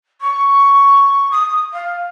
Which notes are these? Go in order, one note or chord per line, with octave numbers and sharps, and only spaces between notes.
C#6
D#6
F5